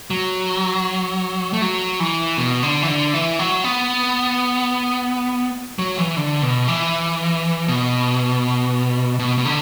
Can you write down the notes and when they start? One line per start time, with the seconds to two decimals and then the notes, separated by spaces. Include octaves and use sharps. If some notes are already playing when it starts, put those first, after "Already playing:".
0.10 F#3
1.53 A3
1.62 F#3
2.00 E3
2.38 B2
2.63 D3
2.82 E3
2.88 D3
3.13 E3
3.39 F#3
3.64 B3
5.79 F#3
5.98 E3
6.17 D3
6.42 B2
6.68 E3
7.68 B2
9.19 B2
9.38 B2
9.45 D3